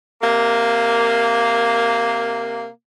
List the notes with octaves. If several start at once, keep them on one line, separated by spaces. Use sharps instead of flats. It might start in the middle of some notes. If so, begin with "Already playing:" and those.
C3 A#3